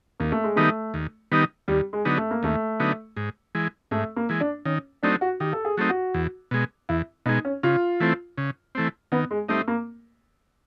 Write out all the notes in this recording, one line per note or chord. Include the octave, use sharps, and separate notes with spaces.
D#2 A#3
A3
G#3
D#3 G3 A3 B3 D#4
D#2
D#3 G3 B3 D#4
D#2 G3
G#3
D3 F#3 B3 D#4
A3
A#3
D#2 A3
D3 F#3 B3 D#4
G#2
E3 G#3
G#2 A3
A#3
E3 G#3
D4
D#3 C#4
F#3 A3 C4 D4 D#4
F#4
D#3 G4
A4
G#4
F#3 A3 C4 D#4
F#4
E2
B2 G#3
E2 E4
B2 G#3 D#4
C#4
C#3 F4
E3 A3 C4
C#3
E3 A3 C4
D#3 B3
G#3
G3 A3 C4 D#4
A#3